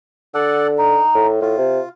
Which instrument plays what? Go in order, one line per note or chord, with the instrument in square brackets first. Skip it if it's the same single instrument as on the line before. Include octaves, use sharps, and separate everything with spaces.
[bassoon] D3 [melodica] A4 D5 F#5
[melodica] D#4
[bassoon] A2
[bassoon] A2 [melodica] F4
[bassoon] C3